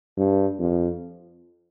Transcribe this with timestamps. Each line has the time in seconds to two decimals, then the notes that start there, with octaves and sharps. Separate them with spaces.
0.17 G2
0.59 F2